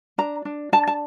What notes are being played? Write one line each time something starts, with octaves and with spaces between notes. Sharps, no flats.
D4 A#5
D4
D4 A5
A5